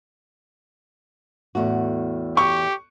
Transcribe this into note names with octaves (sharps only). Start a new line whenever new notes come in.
E2 A2 F#4
G4 C#6